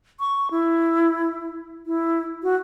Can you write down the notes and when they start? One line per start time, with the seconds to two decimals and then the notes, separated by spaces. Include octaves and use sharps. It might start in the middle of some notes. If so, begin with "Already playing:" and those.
0.20 C#6
0.51 E4
1.86 E4
2.43 F#4